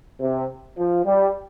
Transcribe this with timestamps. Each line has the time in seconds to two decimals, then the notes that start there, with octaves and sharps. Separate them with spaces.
0.19 C3
0.76 F3
1.04 G3